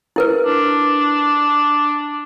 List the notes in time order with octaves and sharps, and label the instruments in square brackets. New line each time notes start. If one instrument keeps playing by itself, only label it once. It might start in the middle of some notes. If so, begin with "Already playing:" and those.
[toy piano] E4 A#4 B4
[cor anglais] D4